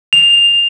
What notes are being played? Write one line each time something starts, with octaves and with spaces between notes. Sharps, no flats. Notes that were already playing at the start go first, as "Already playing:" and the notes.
F7